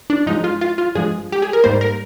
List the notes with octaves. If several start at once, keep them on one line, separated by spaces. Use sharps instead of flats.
D4
G2 F3 G#3 D#4
F4
F4
F4
G2 F3 G#3 G#4
G4
G#4
A#4
G#2 G3 A#3 C5
A#4